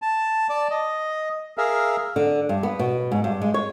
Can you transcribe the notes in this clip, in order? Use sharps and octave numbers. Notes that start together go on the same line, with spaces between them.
A5
D5 A5
D#5
G#4 A#4 E5 F5
D3
G2
B3
B2
G#2
G2
G#3
C#5